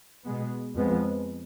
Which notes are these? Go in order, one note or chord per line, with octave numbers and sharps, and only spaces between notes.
B2 G#3 B3
F2 F3 G#3 B3